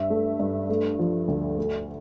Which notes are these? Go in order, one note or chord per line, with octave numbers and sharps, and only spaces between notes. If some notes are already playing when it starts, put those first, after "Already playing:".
Already playing: G2 E5
A3
G2
A3
F3
D2
A3